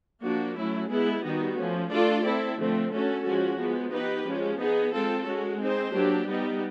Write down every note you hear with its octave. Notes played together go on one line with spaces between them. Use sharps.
F3 A#3 D4 F#4
F#3 A3 C#4 E4
G#3 B3 E4 G#4
D#3 G3 B3 D#4 F#4
F3 A3 C#4
A3 D4 F4 A4 D5
C4 E4 A4
D3 F3 A3 C4
A3 C#4 F#4 A4
F3 G#3 C#4 F#4
F3 G#3 B3
B3 D#4 G4 B4
F3 G#3 C#4
B3 D#4 G#4
G#3 C4 F4 A4
G#3 C#4 F#4
C4 D#4 G#4 C5
F#3 A#3 D4 G4
G3 B3 D#4 G4